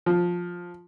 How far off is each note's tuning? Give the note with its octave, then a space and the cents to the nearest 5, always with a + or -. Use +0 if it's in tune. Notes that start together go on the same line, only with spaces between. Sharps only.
F3 +10